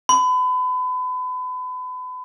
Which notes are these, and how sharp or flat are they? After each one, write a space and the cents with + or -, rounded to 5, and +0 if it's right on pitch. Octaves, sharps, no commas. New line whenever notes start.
B5 +35